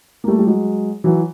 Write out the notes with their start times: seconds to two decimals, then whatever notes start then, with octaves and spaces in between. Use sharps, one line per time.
0.24 A#3
0.28 G3 A3
0.39 G3
0.47 F#3 G#3
1.04 E3 F#3